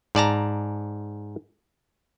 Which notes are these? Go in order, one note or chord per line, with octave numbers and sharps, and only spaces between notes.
G#2 D5 A5 A#5